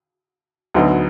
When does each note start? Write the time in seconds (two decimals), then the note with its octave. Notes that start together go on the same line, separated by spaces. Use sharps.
0.74 D2 D3 F#3 B3 D#4